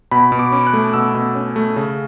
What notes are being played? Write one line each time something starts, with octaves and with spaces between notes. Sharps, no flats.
B2 B5
B2
D6
C#4
F#6
A3
B2 E6
B2
C#4
A3
C#3